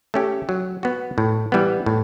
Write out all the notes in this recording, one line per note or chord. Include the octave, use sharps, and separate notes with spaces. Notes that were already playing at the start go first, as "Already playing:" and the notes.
A3 C#4 G4
F#3
B3 F#4
A2
E3 G3 B3
A2